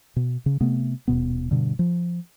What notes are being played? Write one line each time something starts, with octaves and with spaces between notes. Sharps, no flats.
B2
C#3
C3 A3 B3
D#1 B2 B3
G2 B2 D3
F3